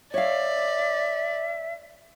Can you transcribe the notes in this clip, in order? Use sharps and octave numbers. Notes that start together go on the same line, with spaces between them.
C#5 D5 E5 F5